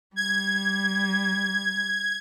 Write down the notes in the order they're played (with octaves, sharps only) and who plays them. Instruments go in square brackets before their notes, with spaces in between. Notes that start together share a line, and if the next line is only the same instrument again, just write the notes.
[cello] G3 [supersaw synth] G#6